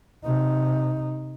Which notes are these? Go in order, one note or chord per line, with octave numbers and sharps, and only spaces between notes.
C3 D#4